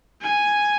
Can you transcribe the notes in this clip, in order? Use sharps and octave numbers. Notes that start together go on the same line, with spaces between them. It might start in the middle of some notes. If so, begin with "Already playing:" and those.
G#5